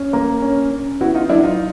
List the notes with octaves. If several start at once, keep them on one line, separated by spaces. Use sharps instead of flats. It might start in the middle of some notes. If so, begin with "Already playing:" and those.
Already playing: C#4
A#3
C#4
C#4
B3 E4 F#4
D#4 F4
F#3 D4 E4
D#4 F4